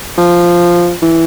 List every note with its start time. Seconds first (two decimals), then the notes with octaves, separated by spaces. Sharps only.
0.18 F3
1.02 E3